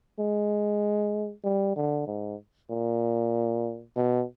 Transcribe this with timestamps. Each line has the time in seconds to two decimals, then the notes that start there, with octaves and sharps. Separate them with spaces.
0.19 G#3
1.44 G3
1.76 D3
2.07 G#2
2.70 A#2
3.96 B2